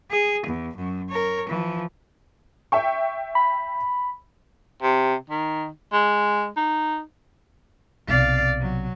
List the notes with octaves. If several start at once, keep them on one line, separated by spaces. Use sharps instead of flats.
G#4
E2
F#2
A#4 C#5
E3 F3
E5 G5 C#6
B5
C3
D#3
G#3
D#4
B1 C3 D5 F5
F#3